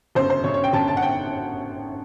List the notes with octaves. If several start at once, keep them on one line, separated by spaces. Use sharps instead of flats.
G1 F#2 C#3 C5
C5
G1 F#2 C#3 C#5
C#5
G5
G1 F#2 C#3 A5
A5
F#5
G5